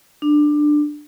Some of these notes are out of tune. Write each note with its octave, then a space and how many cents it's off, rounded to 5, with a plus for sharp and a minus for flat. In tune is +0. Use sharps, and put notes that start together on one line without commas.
D4 +15